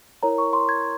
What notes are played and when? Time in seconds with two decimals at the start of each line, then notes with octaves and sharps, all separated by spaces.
0.23 E4 A#4 C#5 A#5
0.38 C#6
0.53 C6
0.69 G#6